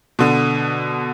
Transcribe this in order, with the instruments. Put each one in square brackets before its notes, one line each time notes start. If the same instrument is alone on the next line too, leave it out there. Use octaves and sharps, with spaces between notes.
[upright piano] B2 D3